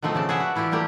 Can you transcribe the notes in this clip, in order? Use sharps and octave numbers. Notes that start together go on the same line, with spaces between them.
B2 D#3 F3 A3 C4
C#3 D5 A5
G#4 B4 D5 E5 F#5 A5
F#4
E3 E4 F4 G4 D5
G3 A3 A#3 G4